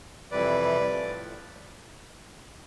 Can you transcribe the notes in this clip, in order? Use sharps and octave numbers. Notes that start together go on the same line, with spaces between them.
F2 C3 E3 G3 B4 D5
A2 F3